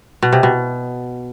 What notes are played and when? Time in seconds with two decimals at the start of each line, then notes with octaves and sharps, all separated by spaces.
0.22 B2
0.32 C3
0.43 B2